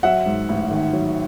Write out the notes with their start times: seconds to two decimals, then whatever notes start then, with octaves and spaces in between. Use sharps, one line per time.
0.03 F#3 E5 F#5
0.26 G#2
0.49 A1
0.71 D#3
0.93 F#3